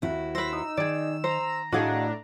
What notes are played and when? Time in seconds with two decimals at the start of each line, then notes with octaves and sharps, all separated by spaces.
0.02 D#2 E4 F#4
0.35 B4 C5 E6 A#6
0.53 D#4
0.77 D#3 G#4 D5
1.24 C5 A#5
1.72 A2 D4 F#4 G#4 D#5 F5 F#5